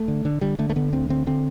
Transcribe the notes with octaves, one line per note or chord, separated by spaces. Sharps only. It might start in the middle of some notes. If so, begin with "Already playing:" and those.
Already playing: A3
D3
D3
D3 G3
D3 A3
A3
D3 B3
D2 C4
D3 C4
D3 C4